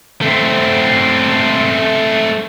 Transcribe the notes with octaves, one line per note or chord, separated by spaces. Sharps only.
A3 C4